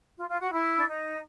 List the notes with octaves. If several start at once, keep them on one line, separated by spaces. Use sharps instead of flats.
F4
F4
F#4
E4
D4
D#4